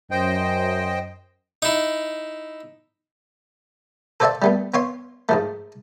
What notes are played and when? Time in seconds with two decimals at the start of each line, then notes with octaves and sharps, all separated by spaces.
0.11 F#2 C5 D#5 G5
1.62 D#4 E4
4.20 A4 C5 D5 E5 F5 A5
4.42 G3 A3 B3
4.74 B3 C#5 F5 C6
5.29 G#2 F3 A3